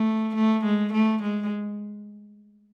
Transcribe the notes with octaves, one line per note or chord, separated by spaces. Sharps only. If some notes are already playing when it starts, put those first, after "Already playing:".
Already playing: A3
A3
G#3
A3
G#3